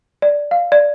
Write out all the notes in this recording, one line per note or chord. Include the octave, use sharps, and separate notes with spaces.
D5
F5
D5